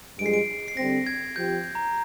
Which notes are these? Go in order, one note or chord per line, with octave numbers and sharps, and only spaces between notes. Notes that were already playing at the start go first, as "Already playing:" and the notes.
G2 F3 G#3 D7
C7
D7
C7
D3 G3 C4 A#6
G#6
F3 C4 G4 C5 G6
A#5